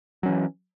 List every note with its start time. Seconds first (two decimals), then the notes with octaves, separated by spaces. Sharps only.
0.23 F#3
0.26 C#4
0.28 E3